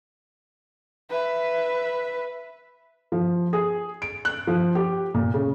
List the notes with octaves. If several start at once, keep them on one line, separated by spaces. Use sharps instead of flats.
B4 E5
F3
G#4
D7
F#6
F3
G4
A#2
C#3